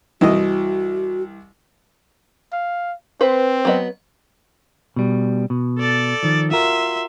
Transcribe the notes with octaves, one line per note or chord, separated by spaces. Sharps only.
C2 E3 F#4 D#5
F5
C4 B4 C5
F#3 B3 D#5
B2 G3
B2
A4 D5
D#3 F3
F4 F#4 A#4 E5 C6